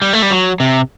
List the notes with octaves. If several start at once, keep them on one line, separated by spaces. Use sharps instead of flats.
G3
A3
G3
F#3
C3